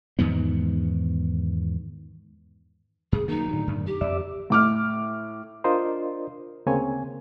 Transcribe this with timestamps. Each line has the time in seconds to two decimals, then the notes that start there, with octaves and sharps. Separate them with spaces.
0.19 E2 G#2 D#3 B3
3.12 F#2 G#4
3.28 D#3 F#3 A#3 D#4
3.53 A2 D3
3.67 F#2
3.87 G4
4.01 F2 D5 E5
4.50 A2 D6 F6
5.64 D4 F4 A#4 C5 D5 D#5
6.66 D2 C#3 A#3 C4 C#5 G#5